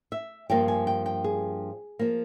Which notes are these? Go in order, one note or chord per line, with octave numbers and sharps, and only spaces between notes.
E5
G2 F3 A#3 G5
G#5
G5
G5
G#4
F3 A#3